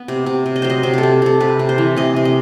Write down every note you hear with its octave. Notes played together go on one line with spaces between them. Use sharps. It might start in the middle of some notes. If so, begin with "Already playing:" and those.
Already playing: B3
C3
C3
C3
D#5
F#3 C5
D#5
C3 C5
G4 A4
C3
C3 A4
C3 B4
C3
C5
E3
C3 D#5
C3
D#5